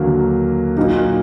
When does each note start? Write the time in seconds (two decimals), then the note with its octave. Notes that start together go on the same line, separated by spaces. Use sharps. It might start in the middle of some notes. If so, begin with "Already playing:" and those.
Already playing: D#2 D3 F#3 A#3
0.77 A#2 F#3 A#3 D#4